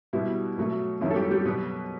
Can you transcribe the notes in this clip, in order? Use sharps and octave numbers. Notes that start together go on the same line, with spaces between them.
B2 G3 B3 E4
B2 F#3 A3
F#2 D#3 F#3 B3 E4
A4
G3 G4
G3 G4
B2 F#3 B3 B4